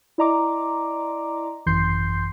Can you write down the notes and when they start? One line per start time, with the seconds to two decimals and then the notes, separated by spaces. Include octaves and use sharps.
0.18 E4 D5 D#5 A#5 C6 D6
1.66 G#1 F#2 E3 C6 G6 C7